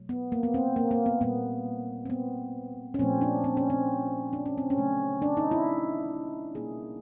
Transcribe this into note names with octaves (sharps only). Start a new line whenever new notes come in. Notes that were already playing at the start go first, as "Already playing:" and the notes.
Already playing: B2 F#3 A3
B3
A#3
B3
C4
A#3
A#3
B3
A#2 G3 A#3 B3
C4
B3
C#4
A#2 F3 A3 C4
D4
C4
C#4
C4
D4
C#4
C4
C#4
C#3 F#3 A3
D4
D#4
E4
B2 G3 A#3 G#4